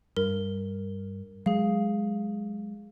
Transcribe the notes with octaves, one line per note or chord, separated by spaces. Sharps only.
G2 A#4
F#3 G#3 G#4 F5